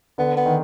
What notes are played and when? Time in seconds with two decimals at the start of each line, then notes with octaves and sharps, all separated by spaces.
0.18 D3 B3
0.37 B3
0.46 D#3